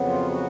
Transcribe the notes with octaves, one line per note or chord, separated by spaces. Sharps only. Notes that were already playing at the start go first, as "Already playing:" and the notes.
Already playing: F2 C#3 F#3 B3
F4
F#4